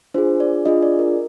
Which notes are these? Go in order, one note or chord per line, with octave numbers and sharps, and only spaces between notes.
D4 F4 G#4 C5
D5
D4 F4 G#4 D#5
D5
A#4